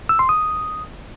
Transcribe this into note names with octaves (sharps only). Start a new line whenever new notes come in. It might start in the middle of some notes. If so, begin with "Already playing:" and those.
E6
C6
D#6